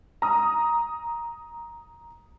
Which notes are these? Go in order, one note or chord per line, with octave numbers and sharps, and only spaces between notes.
A#5 D#6